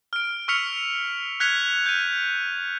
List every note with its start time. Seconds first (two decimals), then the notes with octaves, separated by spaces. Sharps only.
0.13 F6 D7
0.48 C#6 E6 F6 B6 C#7 F7
1.40 F6 F#6 G#6 B6 C#7 F7
1.86 G6 D#7